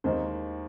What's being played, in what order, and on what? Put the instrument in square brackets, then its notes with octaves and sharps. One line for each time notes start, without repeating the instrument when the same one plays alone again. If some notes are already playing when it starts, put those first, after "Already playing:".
[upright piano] D#2 D#3 G#3 C5